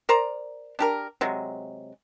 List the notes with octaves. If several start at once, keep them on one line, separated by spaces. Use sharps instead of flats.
A#4 C5 D5 A#5
D4 G4 A#4
C3 F#3 G#3